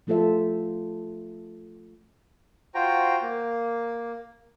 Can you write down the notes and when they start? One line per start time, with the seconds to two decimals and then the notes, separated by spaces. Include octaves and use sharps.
0.07 F3 A3 F4 A4 C5 E5
2.75 F4 F#4 C5 G5 A#5
3.22 A#3